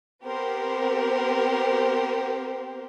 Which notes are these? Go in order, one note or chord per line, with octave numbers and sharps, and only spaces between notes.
B3 C4 G4 A#4 C5